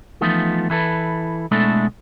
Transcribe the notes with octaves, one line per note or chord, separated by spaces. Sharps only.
E3 F3 A3 B3 D#4 F4
E3 E4 A4 B4
B2 G#3 A3 D4 E4 A4